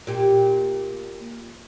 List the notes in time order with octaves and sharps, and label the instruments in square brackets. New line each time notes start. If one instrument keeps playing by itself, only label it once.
[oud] A#2 G4